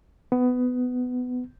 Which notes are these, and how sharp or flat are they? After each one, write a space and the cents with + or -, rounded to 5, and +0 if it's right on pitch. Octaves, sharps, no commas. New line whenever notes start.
B3 +15